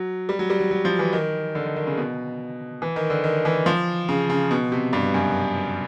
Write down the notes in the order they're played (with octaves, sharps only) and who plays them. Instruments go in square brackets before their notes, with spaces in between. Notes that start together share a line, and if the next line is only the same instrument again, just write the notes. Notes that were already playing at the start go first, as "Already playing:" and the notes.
Already playing: [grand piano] F#3
G3
F#3
G3
F#3
F#3
F3
E3
D#3
D3
D#3
D#3
C#3
B2
E3
D#3
D3
D#3
E3
F3
C#3
C#3
B2
C3
G2
F#2